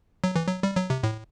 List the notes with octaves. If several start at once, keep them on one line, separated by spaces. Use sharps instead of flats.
F#3
E3
F#3
G3
F#3
C3
A2